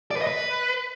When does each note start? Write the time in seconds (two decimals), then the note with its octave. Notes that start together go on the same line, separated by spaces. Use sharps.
0.11 D5
0.16 B4
0.22 D#5
0.27 B4